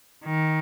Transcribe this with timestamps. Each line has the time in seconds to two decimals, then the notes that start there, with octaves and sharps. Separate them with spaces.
0.24 D#3